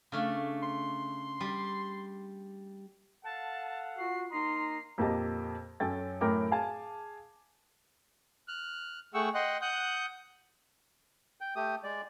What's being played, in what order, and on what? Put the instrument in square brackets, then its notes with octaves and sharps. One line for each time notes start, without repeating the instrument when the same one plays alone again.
[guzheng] C#3 A3 D4
[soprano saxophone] C6
[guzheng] G3
[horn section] A4 F5 F#5 [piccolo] A5
[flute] F4 [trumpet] F#4 [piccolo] C7
[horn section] A#3 D#5 A#5 [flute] D#4 [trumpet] C6 [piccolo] C7
[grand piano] F2 A#2 A#3 G4 D#5 A5
F#2 C#4 A4 G5 A6
F#2 A2 A#4 G5 D6
G#4 F5 G#5 A5
[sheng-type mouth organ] F6 F#6
A3 G#4 F#5 G5 C#6 E6
D#5 F#5 G5 C6 F#6
F#5 D#6 F#6 G6
[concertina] G5
A3 G4 D#6
G#3 D5